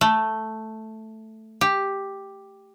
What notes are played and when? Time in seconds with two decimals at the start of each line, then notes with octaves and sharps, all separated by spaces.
0.01 A3
1.61 G4